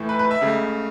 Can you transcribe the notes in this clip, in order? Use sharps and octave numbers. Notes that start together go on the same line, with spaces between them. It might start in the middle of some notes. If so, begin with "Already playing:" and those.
Already playing: A2 E3 A3
B4
B4
E5
C#2 C#3 A3